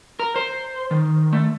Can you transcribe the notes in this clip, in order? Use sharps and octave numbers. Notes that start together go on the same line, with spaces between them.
A#4
C5
D#3
A3